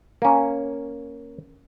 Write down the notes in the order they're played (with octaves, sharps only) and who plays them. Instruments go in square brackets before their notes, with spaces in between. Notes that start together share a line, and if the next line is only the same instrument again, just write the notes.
[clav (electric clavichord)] A#3 C#4